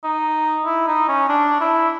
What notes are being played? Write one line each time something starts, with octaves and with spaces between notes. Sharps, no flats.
D#4
E4
D#4
C#4
D4
E4